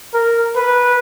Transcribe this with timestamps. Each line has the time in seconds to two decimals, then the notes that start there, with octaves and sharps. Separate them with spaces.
0.14 A#4
0.56 B4